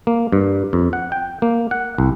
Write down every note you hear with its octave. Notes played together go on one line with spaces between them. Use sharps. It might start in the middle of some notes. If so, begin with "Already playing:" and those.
A#3
G2
F2
F#5
G5
A#3
F#5
C2